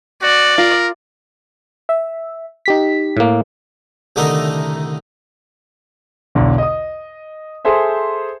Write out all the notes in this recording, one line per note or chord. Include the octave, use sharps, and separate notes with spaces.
F#4 D5
F4 A#4
E5
D#4 G4 B6
A2 A#3
C2 D3 D#3 A3 D#4 A#4
B1 E2 D3
D#5 D#6
G#4 A4 C5 E5